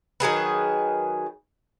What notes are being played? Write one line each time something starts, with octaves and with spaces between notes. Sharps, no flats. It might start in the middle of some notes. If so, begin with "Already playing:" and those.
D#3 F#3 G#4 B4